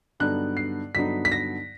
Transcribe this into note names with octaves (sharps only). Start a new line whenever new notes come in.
G2 D3 F#3 B3 D#4 F#6
C7
G2 D3 F#3 B3 D#4 B6
B6
A#6